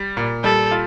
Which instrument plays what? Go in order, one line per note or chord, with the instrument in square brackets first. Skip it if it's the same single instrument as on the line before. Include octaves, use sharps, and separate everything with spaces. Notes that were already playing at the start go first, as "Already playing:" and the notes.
Already playing: [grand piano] G3
A#2
[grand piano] G3 [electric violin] A4
[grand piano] F4